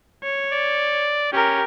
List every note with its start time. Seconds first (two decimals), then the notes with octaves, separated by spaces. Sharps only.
0.23 C#5
0.53 D5
1.33 C#4 G4 A#4